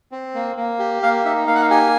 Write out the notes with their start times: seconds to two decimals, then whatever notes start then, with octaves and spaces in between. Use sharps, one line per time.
0.12 C4
0.35 A#3
0.57 A#3
0.79 G4
1.03 A#3 F5
1.25 D#4 E5
1.47 A#3 F5
1.55 F#5
1.62 F5
1.70 G4 G#5